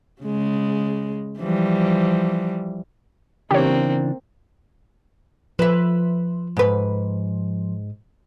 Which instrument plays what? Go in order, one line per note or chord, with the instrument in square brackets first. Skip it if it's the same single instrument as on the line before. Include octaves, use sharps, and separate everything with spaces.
[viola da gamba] C#3 G#3
E3 F3 G3
[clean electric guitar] C#3 E3 D4 [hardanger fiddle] A#3 C4 [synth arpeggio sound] G4 C#5
[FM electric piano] F3 [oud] B4 E5
[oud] G#2 B4